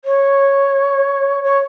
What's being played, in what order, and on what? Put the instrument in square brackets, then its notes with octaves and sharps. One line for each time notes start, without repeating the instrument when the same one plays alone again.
[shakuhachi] C#5
C#5